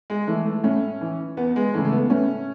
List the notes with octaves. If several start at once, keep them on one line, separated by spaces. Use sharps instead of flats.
G#3
E3 A3
A3
A2 C#4
E3
E2 B3
G#3
C#3 E3 A3
A3
B3
A2 C#4